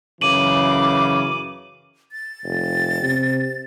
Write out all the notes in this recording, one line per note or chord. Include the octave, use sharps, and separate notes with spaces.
F#2 C#3 E3 D6 D#7 F#7
A6
F1
C3